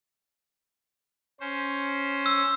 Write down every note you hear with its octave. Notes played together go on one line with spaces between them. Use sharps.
C#4 C5
E6